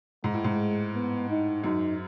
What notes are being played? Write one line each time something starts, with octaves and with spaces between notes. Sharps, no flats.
G#2 G#3
A2
G#2
B3
D#4
F#2 D#4